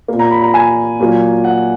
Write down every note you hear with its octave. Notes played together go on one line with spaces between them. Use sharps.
A#2 A#3
A#5
B5
A#5
G#5
A#2 F#3 A#3
F#5